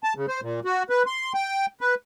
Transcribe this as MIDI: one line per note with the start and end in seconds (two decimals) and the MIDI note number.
0.04 0.14 81
0.16 0.26 49
0.28 0.41 72
0.42 0.60 46
0.65 0.83 66
0.90 1.03 71
1.06 1.33 84
1.34 1.66 79
1.81 1.95 71